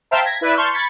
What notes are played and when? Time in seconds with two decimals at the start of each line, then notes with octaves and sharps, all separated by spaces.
0.11 C5 E5 F5 G5 A5 A#5
0.24 G#6 A#6 B6
0.41 E4 B4 D5 E5
0.56 A5 C6 C#6 F6 G6
0.73 B5 G#6 A6 B6 C#7